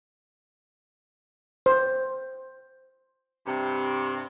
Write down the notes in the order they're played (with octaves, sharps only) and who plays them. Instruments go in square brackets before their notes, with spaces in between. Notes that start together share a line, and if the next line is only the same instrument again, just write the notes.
[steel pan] C5
[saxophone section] G2 C3